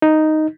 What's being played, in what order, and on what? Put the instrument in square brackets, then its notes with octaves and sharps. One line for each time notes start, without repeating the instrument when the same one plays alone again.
[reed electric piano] D#4